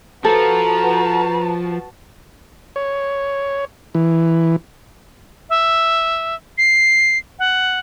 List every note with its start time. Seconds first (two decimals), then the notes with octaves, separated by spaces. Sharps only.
0.25 F3 F#4 A4 B4 A5 A#5
2.76 C#5
3.95 E3
5.50 E5
6.58 C7
7.39 F#5